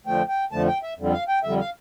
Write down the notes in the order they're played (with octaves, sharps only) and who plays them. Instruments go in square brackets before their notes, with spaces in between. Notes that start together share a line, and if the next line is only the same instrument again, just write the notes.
[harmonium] F2 D3 F3 A3 G5
G5
F2 D3 F3 A3 A5
G5
E5
F2 D3 G3
F5
G5
F2 D3 G3 E5
F5